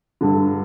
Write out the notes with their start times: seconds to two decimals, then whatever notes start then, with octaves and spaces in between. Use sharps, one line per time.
0.21 G2 D3